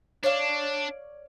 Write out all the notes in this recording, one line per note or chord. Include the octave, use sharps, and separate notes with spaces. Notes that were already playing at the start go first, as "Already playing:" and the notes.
D4 C#5 D5 F5